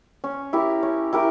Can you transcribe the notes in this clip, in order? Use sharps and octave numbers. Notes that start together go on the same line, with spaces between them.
C#4
E4 G4 A#4
C#4
E4 G4 A#4